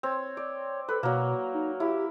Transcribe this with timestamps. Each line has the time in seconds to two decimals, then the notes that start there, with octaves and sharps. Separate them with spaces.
0.03 C4 C#5
0.37 D5
0.89 A4 B4
1.03 B2 F#3 A#3
1.54 D#4
1.80 E4 G4